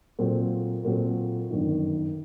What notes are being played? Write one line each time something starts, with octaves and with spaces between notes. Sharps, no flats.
A#2 F#3 C4 F#4 A4
A#2 F#3 C4 F#4 A4
G1 F#2 D#3